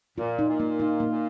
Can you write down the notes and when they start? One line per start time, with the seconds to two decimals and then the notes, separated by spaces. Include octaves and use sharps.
0.18 A#2 F4
0.39 D#4
0.48 A#2
0.60 A#3
0.80 D#4 F4
1.00 A#3
1.10 A#2